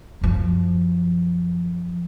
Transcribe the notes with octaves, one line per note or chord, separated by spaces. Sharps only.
F#2 F3